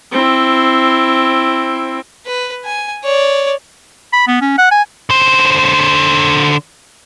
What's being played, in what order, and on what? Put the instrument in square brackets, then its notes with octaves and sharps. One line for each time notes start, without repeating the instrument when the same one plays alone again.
[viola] C4 E4
[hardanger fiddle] B4
G#5
C#5 D5
[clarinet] B5
B3
C#4
F#5
G#5
[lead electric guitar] D3 C5